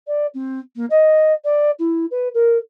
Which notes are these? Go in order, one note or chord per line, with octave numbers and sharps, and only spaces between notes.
D5
C4
A#3
D#5
D5
E4
B4
A#4